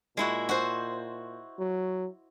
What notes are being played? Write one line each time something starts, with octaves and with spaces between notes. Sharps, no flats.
A#2 G#3 E4 F#4
F#4 C5
F#3